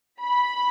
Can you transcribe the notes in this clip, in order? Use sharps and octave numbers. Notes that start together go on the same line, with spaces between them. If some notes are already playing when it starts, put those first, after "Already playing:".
B5